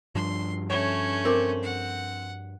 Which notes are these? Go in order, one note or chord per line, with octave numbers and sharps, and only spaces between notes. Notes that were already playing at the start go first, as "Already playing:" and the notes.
G2 F3 D4 C6
A3 C#4 C#5
C4 A#4 D6
F#5